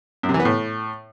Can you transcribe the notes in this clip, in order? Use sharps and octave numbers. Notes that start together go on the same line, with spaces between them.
F#2
C3
E3
B3
A2